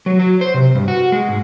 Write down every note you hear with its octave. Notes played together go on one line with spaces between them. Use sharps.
F#3
F#3
C5
C3
G2
F#4
G#3
G#2